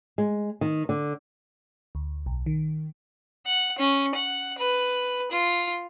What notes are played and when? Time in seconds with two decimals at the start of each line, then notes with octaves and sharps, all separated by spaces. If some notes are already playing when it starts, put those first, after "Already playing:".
0.18 G#3
0.61 D#3
0.89 D3
1.95 D2
2.26 B1
2.46 D#3
3.46 F#5
3.79 C#4
4.15 F#5
4.58 B4
5.31 F4